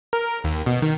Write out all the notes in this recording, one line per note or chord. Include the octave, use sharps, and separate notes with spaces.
A#4
D#2
B2
D#3